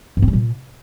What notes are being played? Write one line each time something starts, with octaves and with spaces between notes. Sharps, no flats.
G2
C4
G3
A#2